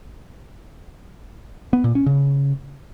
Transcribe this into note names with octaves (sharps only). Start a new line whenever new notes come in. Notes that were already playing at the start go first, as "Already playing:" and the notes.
B3
A#2
C#4
C#3